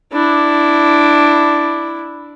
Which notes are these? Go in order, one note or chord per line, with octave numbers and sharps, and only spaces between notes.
D4 E4